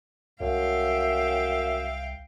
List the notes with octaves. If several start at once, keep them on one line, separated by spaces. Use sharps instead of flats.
C2 F#2 E5 F5 G5